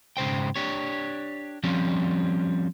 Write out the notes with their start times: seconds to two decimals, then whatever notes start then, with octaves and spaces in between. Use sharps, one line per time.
0.17 G#2 C#3 C5 G5
0.56 D4 G4 C#5
1.63 F3 G3 C4 C#4